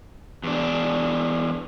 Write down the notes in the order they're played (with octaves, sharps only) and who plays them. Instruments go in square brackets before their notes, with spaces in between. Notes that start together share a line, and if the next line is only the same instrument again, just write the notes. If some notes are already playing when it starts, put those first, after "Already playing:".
[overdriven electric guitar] E2 D4